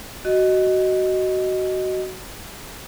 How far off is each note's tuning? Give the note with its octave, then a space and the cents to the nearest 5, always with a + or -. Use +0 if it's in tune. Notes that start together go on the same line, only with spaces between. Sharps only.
F#4 +20 D#5 +0